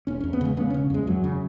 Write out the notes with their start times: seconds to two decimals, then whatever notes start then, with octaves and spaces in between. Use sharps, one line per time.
0.07 E1 C#4
0.21 E2 C#4
0.33 B3
0.41 C#3 G#3
0.57 C#3 B3
0.70 E1 C#4
0.90 E2 G#3
1.07 F#2 F#3
1.24 C#3